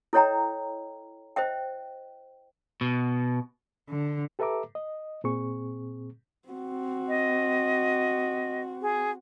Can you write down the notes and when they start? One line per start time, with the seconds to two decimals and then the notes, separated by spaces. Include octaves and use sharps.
0.13 E4 A4 C#5 D#5 G5 A#5
1.36 C5 D#5 E5 G5
2.81 B2
3.90 D3
4.39 G4 A4 B4 E5 A#5 D6
4.75 D#5
5.24 A#2 C4 G#4 C#6
6.49 C4 F#4
7.08 D#5
8.82 G#4